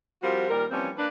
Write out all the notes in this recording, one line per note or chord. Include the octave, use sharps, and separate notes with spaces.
F3 G3 C4 F4 F#4 A#4
D#2 A#2 G3 A#4
E3 F3 G3 A#3 C4 C#4
A#3 D4 B4